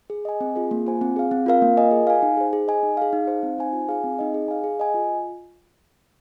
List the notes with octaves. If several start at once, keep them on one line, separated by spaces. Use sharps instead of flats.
G#4
D#5 G#5
C4
F4 G#4
A#3
F4 C5 G#5
C4
G#4 F5
C4
F4 A#4 F5
A#3
F4 A#4 D#5 G#5
G#4
F5 G#5
D#4
G#4 C5
G#4
D#5 G#5
D#4
G#4 F5
D#4
C5 F5
C4
D#4 C5 G#5
F4
G#4 F5 G#5
C4
D#4 G#4 D#5
G#4
F5 G#5
G#4
D#5 G#5
F4